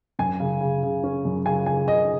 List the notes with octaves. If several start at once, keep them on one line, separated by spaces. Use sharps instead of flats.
F#2 G#5
C#3
C#3
C#3
C#4
F#2
C#3 G#5
C#3 G#5
C#3 D#5